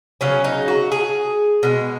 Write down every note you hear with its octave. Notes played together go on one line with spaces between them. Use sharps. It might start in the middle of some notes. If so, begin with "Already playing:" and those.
C#3 F#3 C#4
D#4
F#4
G#4
B2 G#3